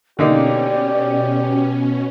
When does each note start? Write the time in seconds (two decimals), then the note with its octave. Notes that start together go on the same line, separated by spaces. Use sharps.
0.19 B2 D3 A#3 C#4 D#4 G4 D5